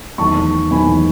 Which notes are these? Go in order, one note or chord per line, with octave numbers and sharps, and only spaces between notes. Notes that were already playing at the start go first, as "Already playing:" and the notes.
E2 D#3 F#3 A3 A5 C#6
E2 D#3 F#3 A3 G#5 B5